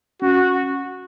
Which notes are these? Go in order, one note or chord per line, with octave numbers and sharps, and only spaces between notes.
C#4 F#4